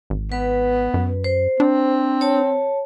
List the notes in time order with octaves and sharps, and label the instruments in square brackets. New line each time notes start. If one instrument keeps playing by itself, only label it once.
[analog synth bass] G#1
[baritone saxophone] B3 [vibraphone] B4
[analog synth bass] F#2
[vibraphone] C5
[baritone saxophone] C4 [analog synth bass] D4
[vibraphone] C#5 A5